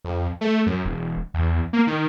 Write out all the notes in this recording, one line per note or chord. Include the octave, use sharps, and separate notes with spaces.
F2
A3
F#2
E1
E2
A#3
D#3